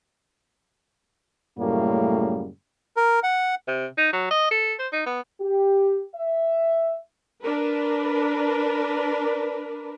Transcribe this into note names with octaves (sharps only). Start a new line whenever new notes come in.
F#2 A2 C#3 G3 A3 A#3
A#4
F#5
C3
D#4
F#3
D#5
A4
C5
D#4
B3
G4
E5
D4 A#4 B4